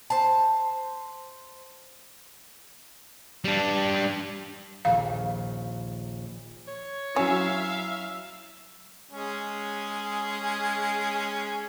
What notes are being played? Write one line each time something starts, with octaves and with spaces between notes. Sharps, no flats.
C5 A5
G3 D4
D#1 A#1 F5
C#5
F#3 C#4 E4 E5 F5
G#3 C#4 G#4